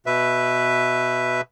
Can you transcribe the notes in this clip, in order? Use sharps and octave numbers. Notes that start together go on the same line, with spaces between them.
B2 B4 E5